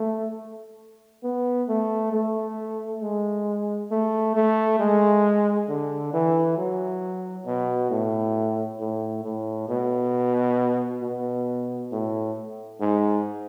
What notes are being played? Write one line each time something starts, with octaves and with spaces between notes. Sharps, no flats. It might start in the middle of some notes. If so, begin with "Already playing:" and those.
Already playing: A3
B3
A3
A3
G#3
A3
A3
G#3
D3
E3
F#3
B2
A2
A2
A2
B2
B2
A2
G#2